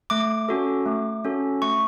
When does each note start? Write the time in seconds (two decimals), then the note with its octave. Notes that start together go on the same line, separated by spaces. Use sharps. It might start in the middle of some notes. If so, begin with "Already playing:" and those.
0.10 A3 D6
0.49 C#4 F#4 A4
0.86 A3
1.24 C#4 F#4 A4
1.62 A3 C#6